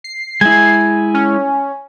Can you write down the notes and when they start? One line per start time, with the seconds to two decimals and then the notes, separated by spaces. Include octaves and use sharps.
0.04 C7
0.41 G#3 E4 G#5
1.14 C#4